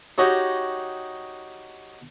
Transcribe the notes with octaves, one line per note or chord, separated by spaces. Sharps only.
D#4 F#4 G4 C#5 D#5